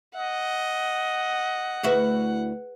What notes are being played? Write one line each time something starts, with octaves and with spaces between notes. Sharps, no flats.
D#5 F#5
D2 E4 F#4 G#4 B4